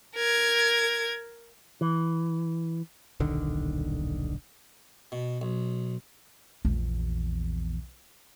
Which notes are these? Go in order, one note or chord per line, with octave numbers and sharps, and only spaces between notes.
A#4 G#6
E3
D#1 B1 D3 D#3
B2
B1
A#1 E2